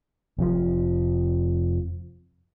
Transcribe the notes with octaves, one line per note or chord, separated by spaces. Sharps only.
F1 F2 F3